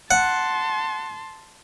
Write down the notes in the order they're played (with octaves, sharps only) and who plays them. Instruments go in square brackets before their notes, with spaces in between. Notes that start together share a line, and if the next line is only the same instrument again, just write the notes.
[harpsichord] F#5 [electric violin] A5 C6